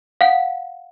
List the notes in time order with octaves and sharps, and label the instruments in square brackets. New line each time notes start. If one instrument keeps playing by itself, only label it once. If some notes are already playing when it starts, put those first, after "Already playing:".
[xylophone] F5 F#5